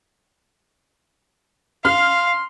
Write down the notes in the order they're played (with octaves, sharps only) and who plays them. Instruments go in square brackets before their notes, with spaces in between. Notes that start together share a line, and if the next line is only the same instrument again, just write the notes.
[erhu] F5 [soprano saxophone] C6 [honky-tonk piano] F6